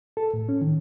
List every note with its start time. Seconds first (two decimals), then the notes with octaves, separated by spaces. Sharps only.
0.17 A4
0.34 A2
0.49 C#4
0.61 D#3